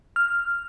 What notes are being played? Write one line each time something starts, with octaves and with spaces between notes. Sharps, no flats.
F6